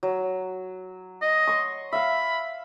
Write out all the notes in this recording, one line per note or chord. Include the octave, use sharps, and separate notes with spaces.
F#3
D#5
C6 C#6
E5 F5 B5